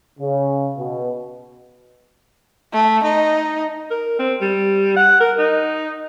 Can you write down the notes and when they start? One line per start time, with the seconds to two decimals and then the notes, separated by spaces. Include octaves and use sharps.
0.19 C#3
0.77 B2
2.73 A3
3.04 D#4
3.91 A#4
4.19 C4
4.41 G3
4.96 F#5
5.21 A#4
5.39 D#4